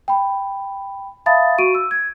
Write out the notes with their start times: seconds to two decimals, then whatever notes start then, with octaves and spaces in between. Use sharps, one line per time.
0.08 G5 B5
1.26 E5 F5 A5 B5 D#6 A6
1.58 F#4 C#6 D7 D#7
1.75 E6
1.91 G#6